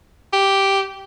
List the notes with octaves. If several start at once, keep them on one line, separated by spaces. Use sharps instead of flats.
G4